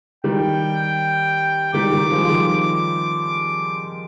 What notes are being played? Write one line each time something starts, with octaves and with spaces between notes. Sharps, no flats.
D#3 G3 G5
D#3 G3 D6
D#3 G3
F3 G#3
F3
D#3 G3
D6